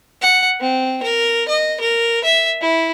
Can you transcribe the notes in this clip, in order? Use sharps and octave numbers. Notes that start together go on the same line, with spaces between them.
F#5
C4
A#4
D#5
A#4
E5
E4